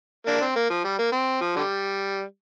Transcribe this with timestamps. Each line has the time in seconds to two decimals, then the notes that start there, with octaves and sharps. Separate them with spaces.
0.27 A#3 D4
0.41 C4
0.56 A#3
0.70 F3
0.84 G3
0.99 A#3
1.12 C4
1.41 F3
1.56 D3 G3